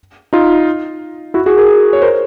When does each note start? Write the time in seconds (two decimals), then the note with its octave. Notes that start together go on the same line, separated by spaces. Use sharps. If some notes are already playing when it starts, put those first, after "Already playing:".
0.33 D#4 F4
1.34 E4 F#4
1.46 F#4 G#4
1.57 G#4 A#4
1.93 C#5
2.02 A#4 C5